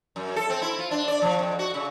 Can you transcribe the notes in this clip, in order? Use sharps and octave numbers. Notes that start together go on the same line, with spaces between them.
F#2
A4
C4
E4
F4
D4
D5
F3
F2
F#4
C#3